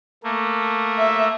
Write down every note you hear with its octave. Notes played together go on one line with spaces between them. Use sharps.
A3 A#3
E5